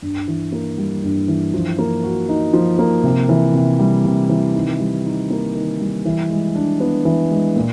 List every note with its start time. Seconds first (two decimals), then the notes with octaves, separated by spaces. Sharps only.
0.02 G2
0.28 E3
0.52 A#3
0.78 G3
1.03 G2
1.28 E3
1.54 F3
1.79 A#3
2.03 F#4
2.29 D#4
2.53 F3
2.79 A#3
3.03 C3
3.29 E3
3.54 C3
3.79 G3
4.05 C3
4.29 E3
4.55 D#3
4.80 G3
5.05 D#4
5.30 A#3
5.55 D#3
5.81 G3
6.05 E3
6.30 G#3
6.55 D4
6.80 B3
7.05 E3
7.31 G#3
7.56 A#2